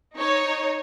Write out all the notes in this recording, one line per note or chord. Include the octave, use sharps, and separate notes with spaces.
D#4 C#5